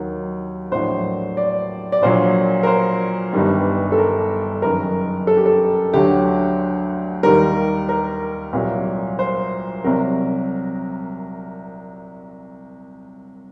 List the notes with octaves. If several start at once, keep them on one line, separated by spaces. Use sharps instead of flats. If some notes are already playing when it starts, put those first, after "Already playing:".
Already playing: D#2 D#3 F#3
A#1 A2 F#3 C5
D5
D5
A#1 A#2 F#3 C5
A#4
C5
G1 G2 D#3 G3
A4
A#4
F#1 F#2 D#3 A#4
A4
G4
A4
D2 D3 F#3 G4
D#2 D#3 G3 A#4
A#4
C2 A#2 F#3
C5
C2 C3 F#3 A#4